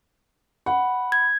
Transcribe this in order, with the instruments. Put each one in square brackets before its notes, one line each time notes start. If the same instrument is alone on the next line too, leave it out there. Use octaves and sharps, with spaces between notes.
[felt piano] F#5 [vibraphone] B5
[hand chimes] G#6